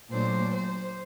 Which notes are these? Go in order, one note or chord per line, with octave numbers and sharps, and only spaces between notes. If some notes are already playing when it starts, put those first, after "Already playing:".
A#2 F#3 A3 D4 C5
C5